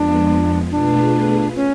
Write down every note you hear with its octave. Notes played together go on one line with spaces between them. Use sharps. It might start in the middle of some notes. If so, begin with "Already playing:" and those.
Already playing: F2 F3 G#3 B3 D4
B2 A3 D4 F4 G#4 B4
C#4